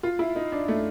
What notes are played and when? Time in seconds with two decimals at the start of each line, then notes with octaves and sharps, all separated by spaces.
0.03 F4
0.19 E4
0.36 D#4
0.52 D4
0.68 A3